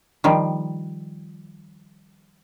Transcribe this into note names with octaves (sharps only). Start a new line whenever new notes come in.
D#3 F3 G3